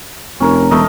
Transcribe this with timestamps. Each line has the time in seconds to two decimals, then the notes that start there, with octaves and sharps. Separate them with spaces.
0.40 F1 C#4 A#4
0.71 E1 A3 A#4 D#5